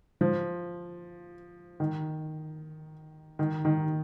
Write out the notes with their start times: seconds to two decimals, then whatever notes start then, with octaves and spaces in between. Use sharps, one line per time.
0.21 F3
1.80 D#3
3.39 D#3
3.65 D#3